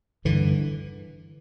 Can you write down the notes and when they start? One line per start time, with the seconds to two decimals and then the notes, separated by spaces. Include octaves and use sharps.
0.25 G2 D3 E3